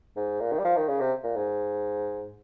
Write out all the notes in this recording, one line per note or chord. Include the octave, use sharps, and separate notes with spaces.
G#2
A#2
D#3
G3
F3
D#3
C#3
C3
A#2
G#2